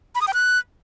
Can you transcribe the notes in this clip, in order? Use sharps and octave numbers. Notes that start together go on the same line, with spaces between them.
B5
D#6
G5
F#6